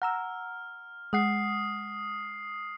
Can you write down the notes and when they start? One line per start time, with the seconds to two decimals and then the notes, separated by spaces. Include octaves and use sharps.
0.02 F#5 A#5 E6 F6
1.13 G#3 F#5 D#6 C7